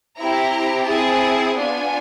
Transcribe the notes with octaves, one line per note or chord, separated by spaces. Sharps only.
C4 E4 G4 A#5
C4 E4 G#4 A5
B3 D4 F4 G#5